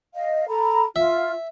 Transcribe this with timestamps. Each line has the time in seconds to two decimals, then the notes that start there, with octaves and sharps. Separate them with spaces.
0.14 D#5 F5
0.48 A4 A#5 B5
0.96 F4 E5